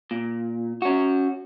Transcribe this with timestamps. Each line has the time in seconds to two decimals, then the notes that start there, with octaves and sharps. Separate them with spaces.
0.11 A#2
0.82 C#4 F#4